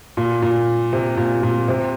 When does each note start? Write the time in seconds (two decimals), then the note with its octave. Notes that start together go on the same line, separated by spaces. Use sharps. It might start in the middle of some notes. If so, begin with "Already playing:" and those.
0.17 A#2
0.42 A#2
0.93 C3
1.17 A#2
1.43 A#2
1.68 C3